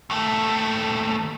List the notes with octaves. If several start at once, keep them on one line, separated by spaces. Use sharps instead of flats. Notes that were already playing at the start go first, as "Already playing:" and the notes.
D#2 A3